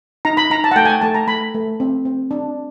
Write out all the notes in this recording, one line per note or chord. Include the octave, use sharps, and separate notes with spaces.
D#4 A#5
B5
D#4 A#5
A5
F#5
A3 G5
G#5
A5
A3 A5
A#5
A3 B5
A3
C4
C4
D4